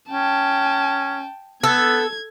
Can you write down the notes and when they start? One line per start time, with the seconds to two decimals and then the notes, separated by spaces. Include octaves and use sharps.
0.10 C#4 G5 A5
1.63 B3 A4 G#6